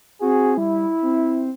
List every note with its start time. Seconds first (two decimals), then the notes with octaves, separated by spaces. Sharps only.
0.21 C4 F#4 G#4
0.58 G3 E4
1.02 C4